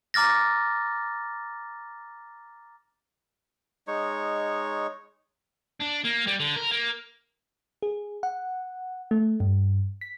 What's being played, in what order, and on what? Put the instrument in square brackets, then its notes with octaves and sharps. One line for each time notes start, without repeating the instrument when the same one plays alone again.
[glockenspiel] A#5 D6 F6 A6 A#6
[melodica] G#3 D#4 C#5 C#6
[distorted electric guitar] D4
A#3
G3
D3
A#4
A#3
[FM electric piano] G#4
F#5
A3
G2
B6